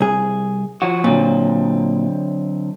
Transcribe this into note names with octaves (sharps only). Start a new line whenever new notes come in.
C2 G#4
F3 F#4
A#2 D3 F#3 C4